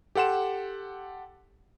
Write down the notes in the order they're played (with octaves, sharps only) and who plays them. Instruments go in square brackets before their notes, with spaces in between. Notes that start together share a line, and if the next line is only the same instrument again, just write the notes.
[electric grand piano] G4 A4 F#5 C6 E7